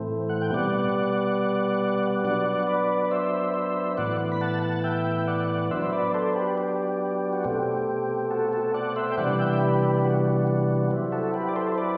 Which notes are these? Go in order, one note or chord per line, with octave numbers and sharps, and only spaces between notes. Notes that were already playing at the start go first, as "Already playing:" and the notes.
Already playing: A2 E3 A3 C4
F#5
G5
B2 G3 B3 D5 F#5
F#3 B3 D4 D5 F#5
B4 D5
D5
C5 E5
C5 E5
A2 E3 B3 D5 F#5
B5
F#5 A5
F#5 A5
E5 G5
D5 F#5
F#3 B3 D4 C5 E5
C5
B4 D5
A4 C5
G4 B4
G4
F#4
B2 A3 C4 G4
F#4 A4
F#4 A4
D5 F#5
C5 E5
G5
C3 E3 G3 B3 D4 D5 F#5
E5 G5
G4 B4
G4 B4
G4
F#4
F#4
F#3 C4 E4
F#4 A4
G4 B4
D5
A4 C5
C5
B4 D5